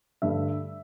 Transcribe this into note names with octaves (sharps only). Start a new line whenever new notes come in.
G2 D3 A3 E5